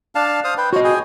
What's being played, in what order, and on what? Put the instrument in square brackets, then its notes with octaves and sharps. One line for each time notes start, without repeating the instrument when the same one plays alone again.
[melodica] D4 F5 A5
C5 F5 D#6
B4 G5
[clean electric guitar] F#4 D#5 [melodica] C5 C#5
[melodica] G#4 G5 G#5